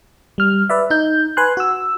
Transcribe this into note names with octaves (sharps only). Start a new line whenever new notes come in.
G3 F6
B4 D5 E5
D#4 G6
B4 G#5 C6 F#6
F#4 E6